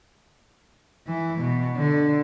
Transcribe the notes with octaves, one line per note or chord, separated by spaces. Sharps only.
E3
B2
D3